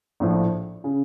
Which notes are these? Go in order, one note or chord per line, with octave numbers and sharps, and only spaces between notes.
A#1 A2 F3
C#3